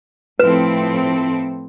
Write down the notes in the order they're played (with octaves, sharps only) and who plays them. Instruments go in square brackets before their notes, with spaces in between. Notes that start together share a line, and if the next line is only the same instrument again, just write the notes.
[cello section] A2 F3 C4 E4 A4 [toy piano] B4